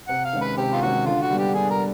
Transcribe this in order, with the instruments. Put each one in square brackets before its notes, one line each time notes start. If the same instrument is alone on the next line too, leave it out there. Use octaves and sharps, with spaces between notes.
[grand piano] C3 [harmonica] F#5
[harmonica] F5
[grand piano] D#3 G#3 C#4
[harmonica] B4
[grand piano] C3 [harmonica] G4
[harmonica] F4
[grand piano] D#3 G#3 C#4 [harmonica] F#4
[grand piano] D3 [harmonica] F4
[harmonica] F#4
[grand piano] G3 B3 D4
[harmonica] G4
[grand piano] D3 [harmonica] G#4
[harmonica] A#4